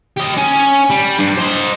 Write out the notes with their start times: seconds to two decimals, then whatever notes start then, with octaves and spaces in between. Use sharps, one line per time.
0.17 G4 D#5
0.37 C#4
0.90 G3
1.19 G2
1.37 C5 D#5